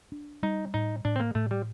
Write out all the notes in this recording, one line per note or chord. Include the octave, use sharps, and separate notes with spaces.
D4
G3 D#4
A2 D#4
A2 D4
C4
A#3
A2 A3
G3